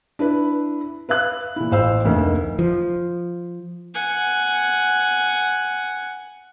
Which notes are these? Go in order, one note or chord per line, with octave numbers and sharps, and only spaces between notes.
D4 E4 B4
B4 E5 F5 F#6
A#2 E4
A1 C5 F5 E6
F1 D2 A#3 D#4
F3
F#5 G#5